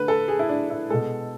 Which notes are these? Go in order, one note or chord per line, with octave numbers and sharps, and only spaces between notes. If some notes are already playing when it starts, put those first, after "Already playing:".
Already playing: D3 A3 B4
A4
G#4
E4
D4
E4
B2 G#3 A4